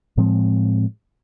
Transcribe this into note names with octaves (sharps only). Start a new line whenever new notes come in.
A2 F3 G#3 C4